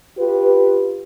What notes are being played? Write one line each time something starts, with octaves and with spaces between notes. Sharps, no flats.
F4 G4 B4